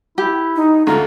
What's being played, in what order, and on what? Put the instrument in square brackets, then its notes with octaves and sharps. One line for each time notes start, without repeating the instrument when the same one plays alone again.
[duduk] E4 [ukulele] G4
[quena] D#4
[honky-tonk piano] D2 [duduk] F4 [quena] A#5